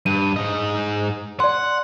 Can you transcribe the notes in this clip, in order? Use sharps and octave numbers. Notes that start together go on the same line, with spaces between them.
G2 D#7
G#2 D#5
D5 F#5 C6